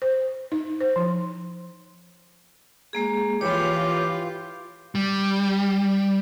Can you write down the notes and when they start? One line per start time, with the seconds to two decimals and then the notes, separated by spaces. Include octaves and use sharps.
0.02 C5
0.52 D#4
0.81 C5
0.96 F3
2.93 G#3 A#3 G#4
3.41 E3 F4 G4 C#5
4.95 G3